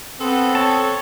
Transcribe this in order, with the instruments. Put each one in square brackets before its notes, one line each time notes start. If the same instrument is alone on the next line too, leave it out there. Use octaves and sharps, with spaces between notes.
[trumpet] B3 [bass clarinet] C4 [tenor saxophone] A4
[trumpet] C#5 [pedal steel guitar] A5